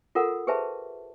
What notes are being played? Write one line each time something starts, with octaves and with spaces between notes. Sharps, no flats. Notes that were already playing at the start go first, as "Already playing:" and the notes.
F4 A4 A#4 F#5
G4 G#4 B4 C5 E5 A5